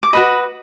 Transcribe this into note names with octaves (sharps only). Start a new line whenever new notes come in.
D6
F#4 B4 D#5 B5